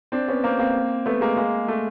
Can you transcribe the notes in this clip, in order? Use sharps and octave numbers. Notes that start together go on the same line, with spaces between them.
C4 D4
B3 C#4
A#3 C4
A#3 C4
A3 B3
G#3 A#3
G#3 A#3
A3